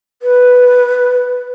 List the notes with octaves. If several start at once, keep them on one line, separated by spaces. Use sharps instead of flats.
B4